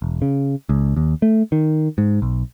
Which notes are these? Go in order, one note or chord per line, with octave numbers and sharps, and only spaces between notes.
E1
C#3
C#2
D#2
A3
D#3
G#2
B1